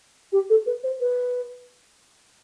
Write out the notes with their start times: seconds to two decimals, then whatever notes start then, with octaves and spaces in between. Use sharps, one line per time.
0.32 G4
0.50 A4
0.66 B4
0.83 C5
1.00 B4